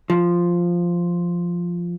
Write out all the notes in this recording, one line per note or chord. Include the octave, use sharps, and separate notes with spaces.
F3